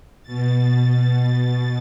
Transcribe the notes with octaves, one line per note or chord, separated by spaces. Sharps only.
B2 A6